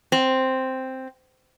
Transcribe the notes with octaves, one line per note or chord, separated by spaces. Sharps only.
C4